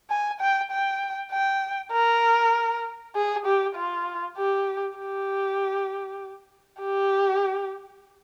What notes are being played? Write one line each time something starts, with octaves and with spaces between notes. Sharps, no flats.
G#5
G5
G5
G5
A#4
G#4
G4
F4
G4
G4
G4